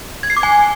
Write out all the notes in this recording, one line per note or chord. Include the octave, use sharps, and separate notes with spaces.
G#6
C7
D6
G#5